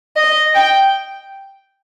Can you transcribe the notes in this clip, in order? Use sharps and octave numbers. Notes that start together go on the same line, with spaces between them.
D#5
G5